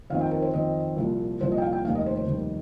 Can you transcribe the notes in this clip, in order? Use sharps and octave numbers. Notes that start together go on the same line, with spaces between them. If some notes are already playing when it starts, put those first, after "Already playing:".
F2 D#3 C4 F5
G5
A#4
C5
F2 D#3 C4 D#5
C2 A#2 F3
C2 A#2 F3 C5
D#5
G5
F5
G5
F1 D#2 D#3 G3 F5
D#5
C5
C5
F1 D#2 D#3 G3